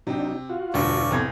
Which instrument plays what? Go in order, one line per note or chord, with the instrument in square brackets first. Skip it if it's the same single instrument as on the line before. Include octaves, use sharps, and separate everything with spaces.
[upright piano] C3 G4 [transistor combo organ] F#3 D4 D#4
[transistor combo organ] F4 F#4
[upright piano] E1 D2 G2 [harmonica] D5 C#6
[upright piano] F1 C2 G#6 [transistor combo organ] B3 C4 A4